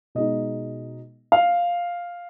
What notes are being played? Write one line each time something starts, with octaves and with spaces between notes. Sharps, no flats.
B2 G#3 D#4 D#5
F5